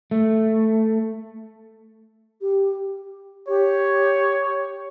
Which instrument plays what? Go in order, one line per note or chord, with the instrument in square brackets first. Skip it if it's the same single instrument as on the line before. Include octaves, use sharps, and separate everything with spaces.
[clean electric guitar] A3
[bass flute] G4
[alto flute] G4 [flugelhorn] C#5